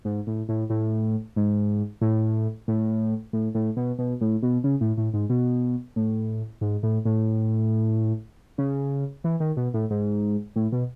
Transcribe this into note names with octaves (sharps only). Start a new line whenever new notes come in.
G#2
A2
A2
A2
G#2
A2
A2
A2
A2
B2
B2
A2
B2
C#3
A2
A2
G#2
B2
A2
G#2
A2
A2
C#3
E3
D#3
B2
A2
G#2
A2
B2